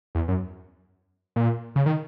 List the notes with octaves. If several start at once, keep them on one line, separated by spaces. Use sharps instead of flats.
E2
F#2
A#2
C#3
D#3